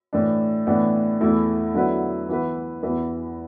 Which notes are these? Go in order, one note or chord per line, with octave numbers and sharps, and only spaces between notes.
A2 E3 D4
A2 E3 B3 D4
E2 E3 A3 E4
D3 F#3 B3 E4 B4
E3 B3 E4 B4
E2 E3 B3 E4 B4